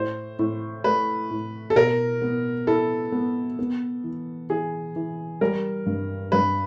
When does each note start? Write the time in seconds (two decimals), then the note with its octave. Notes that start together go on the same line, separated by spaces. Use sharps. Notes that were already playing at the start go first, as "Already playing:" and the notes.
Already playing: A2 C5
0.39 A2
0.84 A3 B4
1.31 A2
1.70 A4
1.76 B2 A#4
2.22 B3
2.67 E4 A4
3.12 B3
3.59 B3
4.04 E3
4.50 E3 G#4
4.96 E3
5.41 G3 A#4
5.86 G2
6.32 G2 B4